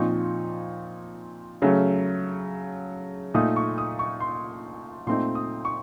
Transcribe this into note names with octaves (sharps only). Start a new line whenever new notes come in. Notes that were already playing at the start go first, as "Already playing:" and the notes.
Already playing: A#2 F3 C4 D#4 C#6
C#3 F#3 A3 C#4
A#2 A3 D#4 D#6
C#6
D#6
C#6
C6
A#2 A3 C4 D#4 C6
D#6
C#6